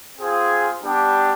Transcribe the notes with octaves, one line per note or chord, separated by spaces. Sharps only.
C4 F4 G#4
G3 B3 D4 G4